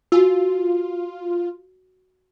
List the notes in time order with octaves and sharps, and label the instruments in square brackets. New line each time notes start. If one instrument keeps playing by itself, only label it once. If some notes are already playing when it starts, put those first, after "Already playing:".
[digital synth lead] F4 [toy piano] F#4 G#5 E6